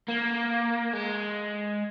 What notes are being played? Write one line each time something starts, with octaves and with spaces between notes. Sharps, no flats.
A#3
G#3